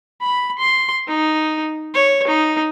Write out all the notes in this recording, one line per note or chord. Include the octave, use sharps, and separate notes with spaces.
B5
C6
D#4
C#5
D#4